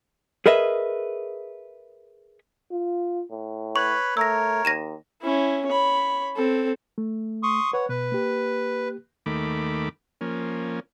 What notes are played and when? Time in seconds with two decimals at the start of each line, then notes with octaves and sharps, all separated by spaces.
0.46 G#4 A#4 B4 D#5 E5
2.72 F4
3.31 A2
3.76 B4 C#5 B5 C#6
4.17 A3 A#4 C#5 E6 A#6
4.65 D#2 A#6 D#7 E7
5.22 C#4 E4
5.67 C#5 B5
6.36 C4 A4
6.98 A3
7.43 C6 C#6 D#6
7.73 B4 C#5 F#5
7.89 B2 B4
8.12 A#3 G4
9.26 D#2 D#3 A3 B5 D6
10.21 F3 A#3 C#4